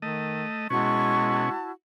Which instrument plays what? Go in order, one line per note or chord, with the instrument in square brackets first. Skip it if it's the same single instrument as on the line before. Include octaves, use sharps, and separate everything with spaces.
[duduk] D#3 [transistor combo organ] A3 D#5
[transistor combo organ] B2 C#4 [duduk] G#3 [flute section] E4 F#4 A5 [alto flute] C#6